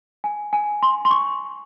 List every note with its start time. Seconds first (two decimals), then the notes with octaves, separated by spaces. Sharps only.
0.24 G#5
0.53 G#5
0.83 C6
1.05 C6
1.11 C#6